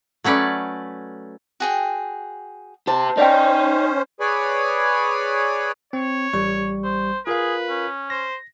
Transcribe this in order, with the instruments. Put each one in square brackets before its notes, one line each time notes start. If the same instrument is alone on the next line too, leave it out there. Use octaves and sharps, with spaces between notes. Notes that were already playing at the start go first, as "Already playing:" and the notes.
[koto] F#3 A3 C#4 B4 D5
[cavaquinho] F#4 G#4 G5
[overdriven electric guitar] G4 C5 [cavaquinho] A5
[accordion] C#4 C5 [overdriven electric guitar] D#4 [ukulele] D5 E5 G5
[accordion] G#4 B4 C#5 D5 G#5 B5
[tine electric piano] C4 [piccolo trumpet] C#5
[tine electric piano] A1 G3 C#6
[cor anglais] C5
[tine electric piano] F4 A#4 F5 [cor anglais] G#4 [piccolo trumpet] B4
[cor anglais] C#4
[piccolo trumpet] C5 [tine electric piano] A#6